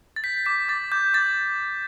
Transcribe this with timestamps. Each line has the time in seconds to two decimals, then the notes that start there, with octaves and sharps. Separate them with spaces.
0.16 A6
0.24 G6 B6
0.46 D6 B6
0.69 D6 A6
0.92 D6 G6
1.14 D6 A6